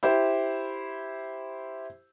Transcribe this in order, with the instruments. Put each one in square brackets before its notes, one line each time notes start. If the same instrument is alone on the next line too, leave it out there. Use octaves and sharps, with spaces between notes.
[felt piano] E4 G4 C5